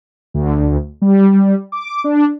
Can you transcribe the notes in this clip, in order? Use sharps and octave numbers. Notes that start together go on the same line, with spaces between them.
D2
G3
D6
D4